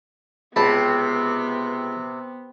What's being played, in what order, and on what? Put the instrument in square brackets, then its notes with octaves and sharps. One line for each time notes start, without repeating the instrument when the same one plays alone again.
[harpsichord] C#2 A5 B5 [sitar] C3 [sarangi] B3